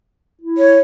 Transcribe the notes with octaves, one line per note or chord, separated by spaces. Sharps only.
E4
C#5